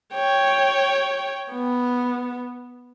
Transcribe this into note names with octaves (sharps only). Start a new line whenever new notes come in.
C#5 G5
B3